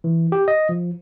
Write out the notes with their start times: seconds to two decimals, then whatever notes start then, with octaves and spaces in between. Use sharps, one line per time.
0.04 E3
0.32 G4
0.48 D#5
0.69 F3